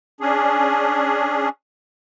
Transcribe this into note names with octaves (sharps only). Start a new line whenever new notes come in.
C#4 D4 G#4